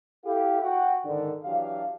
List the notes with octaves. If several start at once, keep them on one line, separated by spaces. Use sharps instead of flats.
E4 G4 A4 F5
F#4 F#5 G5
G#2 D3 D#3 D4
E3 F#3 D4 G4 F5